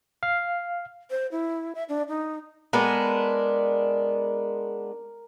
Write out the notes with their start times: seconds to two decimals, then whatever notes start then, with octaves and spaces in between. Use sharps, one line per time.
0.23 F5
1.11 C5
1.32 E4
1.75 E5
1.89 D4
2.09 D#4
2.73 G#3 B3 D4 A#4